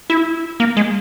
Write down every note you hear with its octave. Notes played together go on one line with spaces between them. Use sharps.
E4
A#3
G#3